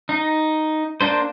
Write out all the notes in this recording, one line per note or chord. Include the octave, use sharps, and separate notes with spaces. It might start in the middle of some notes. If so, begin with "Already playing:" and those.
D#4
A#3 D4 C5